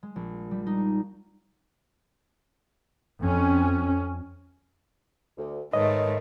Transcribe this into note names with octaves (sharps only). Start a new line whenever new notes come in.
G#3
A#1
G3
D#4
F2 C#4
D2
G#2 D#3 A3 B4 C#5 D#5